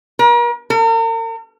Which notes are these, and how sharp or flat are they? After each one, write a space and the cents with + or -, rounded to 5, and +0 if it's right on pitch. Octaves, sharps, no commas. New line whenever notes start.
A#4 +40
A#4 -40